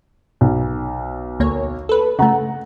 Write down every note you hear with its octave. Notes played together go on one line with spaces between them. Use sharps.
B1
D2 A#3 C#5
A4 B4
C#3 A3 F#5 A#5